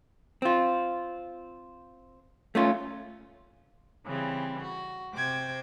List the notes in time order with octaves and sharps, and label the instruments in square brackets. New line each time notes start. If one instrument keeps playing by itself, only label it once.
[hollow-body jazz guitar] C4 F4
A3 C#4 F4
[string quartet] C#3 E3 G3 C4
F#4
C3 C5 G5 D6 G#6